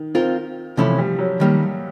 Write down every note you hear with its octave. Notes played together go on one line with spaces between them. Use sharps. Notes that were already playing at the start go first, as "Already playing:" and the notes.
Already playing: D#3
C4 F4 A#4
C3 E3 F3 A3 C#4 E4
G3
F#3
D#3 G3 A#3